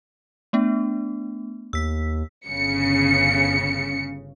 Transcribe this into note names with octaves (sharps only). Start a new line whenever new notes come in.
A3 B3 D4
D#2 E6 B6
G1 C#3 C#7